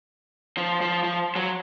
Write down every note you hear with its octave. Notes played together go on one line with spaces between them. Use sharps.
F3
F3
F3
F#3